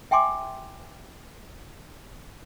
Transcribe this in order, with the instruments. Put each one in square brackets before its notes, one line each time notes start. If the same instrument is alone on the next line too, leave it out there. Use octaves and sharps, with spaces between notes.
[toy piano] E5 G5 G#5 C6 D6